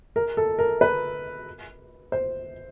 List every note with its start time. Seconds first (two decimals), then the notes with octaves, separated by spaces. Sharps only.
0.16 A#4
0.37 A4
0.59 A#4
0.81 B4
2.12 C5